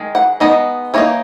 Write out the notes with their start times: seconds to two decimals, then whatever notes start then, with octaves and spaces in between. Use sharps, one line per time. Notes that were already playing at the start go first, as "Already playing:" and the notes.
Already playing: D#3 G#3
0.15 F#5
0.40 G#3 B3 D#4 D#5
0.94 E3 A#3 D#4 C#5